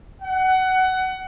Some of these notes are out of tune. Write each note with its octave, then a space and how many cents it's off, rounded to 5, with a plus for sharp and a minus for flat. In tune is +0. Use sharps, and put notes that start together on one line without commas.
F#5 +20